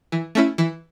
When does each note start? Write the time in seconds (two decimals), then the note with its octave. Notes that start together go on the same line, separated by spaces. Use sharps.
0.12 E3
0.35 A3 C#4 E4
0.58 E3